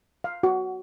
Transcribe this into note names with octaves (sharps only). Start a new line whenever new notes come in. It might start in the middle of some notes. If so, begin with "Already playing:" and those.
F5
F#4